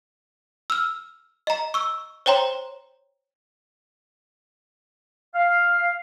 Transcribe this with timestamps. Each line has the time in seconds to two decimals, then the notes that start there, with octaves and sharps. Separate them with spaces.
0.70 E6 F6
1.47 D#5 A#5
1.74 C#6 E6
2.26 C5 C#5 G5 A#5 C6
5.35 F5